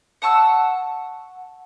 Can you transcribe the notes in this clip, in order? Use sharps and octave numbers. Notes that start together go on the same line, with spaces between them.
F#5 A5 C#6 E6